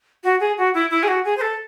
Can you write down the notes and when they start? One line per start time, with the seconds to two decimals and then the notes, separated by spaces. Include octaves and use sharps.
0.24 F#4
0.40 G#4
0.58 F#4
0.74 E4
0.90 E4
1.03 G#4
1.08 F#4
1.25 G#4
1.37 C5
1.41 A4